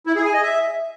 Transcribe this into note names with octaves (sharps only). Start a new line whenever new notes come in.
E4
G#4
G#5
D#5
E5